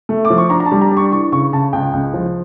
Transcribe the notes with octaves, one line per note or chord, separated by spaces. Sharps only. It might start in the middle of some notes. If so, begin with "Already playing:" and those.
A3
D6
F3
C#6
D4 A#5
A#5
A5
G3
A#5
D4
C#6
E3 C#6
C#3 C#6
C#3 A5
C#2 G5
C#2
F3